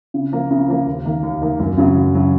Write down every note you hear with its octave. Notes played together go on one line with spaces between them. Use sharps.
C#3
F3 A#3 F4
C#3
F3 A#3 F4
D#2
D#3 A#3
D#2
D#3 A#3
F#2
C#3 F#3
F#2
C#3 F#3